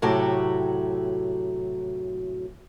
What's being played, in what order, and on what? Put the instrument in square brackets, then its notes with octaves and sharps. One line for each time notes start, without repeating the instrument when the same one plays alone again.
[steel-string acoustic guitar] A2 C3 F#3 F#4 G4 A4